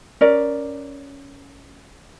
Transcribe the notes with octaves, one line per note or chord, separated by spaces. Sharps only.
C#4 A#4 D5